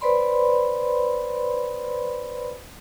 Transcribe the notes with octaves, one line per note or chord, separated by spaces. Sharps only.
B4 C5 D5 B5 C6